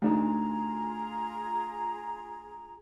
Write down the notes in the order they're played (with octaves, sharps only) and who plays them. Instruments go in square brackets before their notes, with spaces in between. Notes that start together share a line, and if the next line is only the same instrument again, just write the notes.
[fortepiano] D2 D4 D#4 [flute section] F4 G#4 A#5